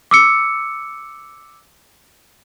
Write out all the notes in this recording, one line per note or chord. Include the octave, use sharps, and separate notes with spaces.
D6 E6 C#7